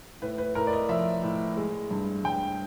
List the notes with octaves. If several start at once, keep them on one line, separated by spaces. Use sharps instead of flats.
A2 B4
B4
A2 A#4
D5
D#5
F3 E5
A2
G#3
G2
G2 G5